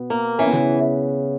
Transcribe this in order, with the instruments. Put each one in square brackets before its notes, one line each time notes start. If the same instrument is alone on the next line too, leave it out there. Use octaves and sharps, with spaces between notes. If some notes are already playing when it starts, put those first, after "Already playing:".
Already playing: [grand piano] B2 B3
[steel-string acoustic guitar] A#3
[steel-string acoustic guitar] E3 [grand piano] C#4
[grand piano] B3
C#3 C#4